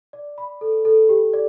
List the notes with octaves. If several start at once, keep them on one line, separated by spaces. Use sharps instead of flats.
D5
B5
A4
A4
G4
D5